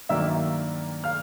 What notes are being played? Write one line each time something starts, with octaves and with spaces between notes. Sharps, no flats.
G2 D#3 F#3 A#3 D4 E5 E6
F5 F6